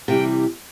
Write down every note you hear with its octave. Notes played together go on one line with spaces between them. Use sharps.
C3 E3 G3 G5